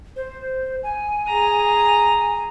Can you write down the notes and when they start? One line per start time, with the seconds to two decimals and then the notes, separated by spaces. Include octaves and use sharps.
0.16 C5
0.83 G#5
1.27 G#4 A#5